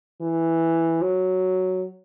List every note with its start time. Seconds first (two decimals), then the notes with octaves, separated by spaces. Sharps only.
0.22 E3
1.02 F#3